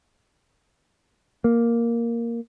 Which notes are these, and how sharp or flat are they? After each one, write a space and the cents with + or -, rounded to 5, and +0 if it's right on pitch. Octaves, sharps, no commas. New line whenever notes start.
A#3 +0